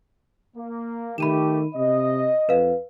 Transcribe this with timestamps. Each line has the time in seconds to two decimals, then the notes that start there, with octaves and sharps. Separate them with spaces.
0.57 A#3
1.18 D#3 A3 G4 B5 D#7 E7
1.75 C3 D#5
2.49 F2 B4 F5